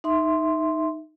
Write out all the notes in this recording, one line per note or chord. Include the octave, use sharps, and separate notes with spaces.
D#4 E5 C6